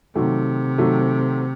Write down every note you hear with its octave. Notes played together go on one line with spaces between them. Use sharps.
C3 D#3 F#3 A3
D#3 F#3 A3